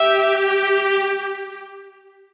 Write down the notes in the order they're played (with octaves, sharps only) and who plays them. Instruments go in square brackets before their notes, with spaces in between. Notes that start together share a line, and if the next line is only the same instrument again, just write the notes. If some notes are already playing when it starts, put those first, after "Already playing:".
Already playing: [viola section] G4 [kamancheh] E5